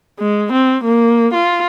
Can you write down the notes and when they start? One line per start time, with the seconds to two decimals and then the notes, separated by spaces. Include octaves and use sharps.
0.19 G#3
0.52 C4
0.84 A#3
1.34 F4